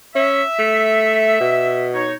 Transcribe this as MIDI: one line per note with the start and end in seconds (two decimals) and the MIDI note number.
0.15 0.43 61
0.15 1.88 76
0.59 1.37 57
1.40 2.13 47
1.94 2.13 63
1.94 2.13 73